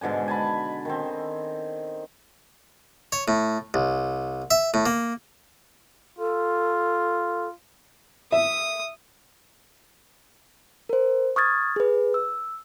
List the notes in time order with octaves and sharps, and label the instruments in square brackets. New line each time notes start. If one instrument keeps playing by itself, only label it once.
[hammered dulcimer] G#2 B2 D3 G#5
G#5 A5 B5
D#3 C4
[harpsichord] C#5
A2
C2
E5
A2
A#3
[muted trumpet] F4 [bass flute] A4
[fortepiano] E5 [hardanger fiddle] D#6
[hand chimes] A#4 C5
C#6 D#6 F6 G#6 A6
G#4 B4
E6